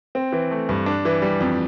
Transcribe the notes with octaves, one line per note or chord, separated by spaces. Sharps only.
C4
E3
A3
G2
D4
E3
G3
F2